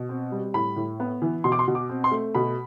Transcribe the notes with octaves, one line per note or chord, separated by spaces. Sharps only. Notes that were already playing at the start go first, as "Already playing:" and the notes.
Already playing: B2
C4
G3
A2 B5
A2
B3
E3
B2 C6
D6
C6
B2
D6
C4
C6
A3
B2 B5